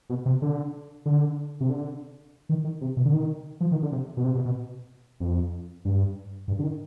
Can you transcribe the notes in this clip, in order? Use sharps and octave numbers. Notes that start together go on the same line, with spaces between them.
B2
C3
D3
D3
C3
D3
D#3
D#3
C3
B2
D3
D#3
F3
D#3
D3
C3
B2
C3
B2
B2
F2
G2
G2
D3
D#3